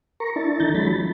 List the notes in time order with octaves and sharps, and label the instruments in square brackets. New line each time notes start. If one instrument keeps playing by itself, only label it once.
[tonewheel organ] A#4 A#5 C#6
D4 E4 A5
D#3 D#4 A4 A#5 G6 A6
F3 F#3 G#3 C#4 B5 A6
F3